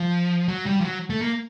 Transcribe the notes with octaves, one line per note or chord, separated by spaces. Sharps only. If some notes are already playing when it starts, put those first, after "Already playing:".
Already playing: F3
F#3
G3
F3
F#3
A3
A#3